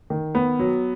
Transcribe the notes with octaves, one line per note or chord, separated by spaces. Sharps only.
D#3
B3
F#3